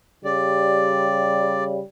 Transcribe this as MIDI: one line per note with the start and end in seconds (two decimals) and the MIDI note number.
0.25 1.80 49
0.25 1.80 55
0.25 1.64 74